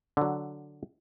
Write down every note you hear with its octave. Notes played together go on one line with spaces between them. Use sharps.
D3 F#3